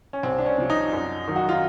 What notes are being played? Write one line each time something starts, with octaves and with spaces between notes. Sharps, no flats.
C#4
C2 C4
D4
C#4
C3 F3
D#4
F#2
D#3 F#3
F#4
F4